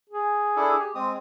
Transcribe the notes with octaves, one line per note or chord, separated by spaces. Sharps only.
G#4
D4 E4 A4
G4
G#3 C4 D#6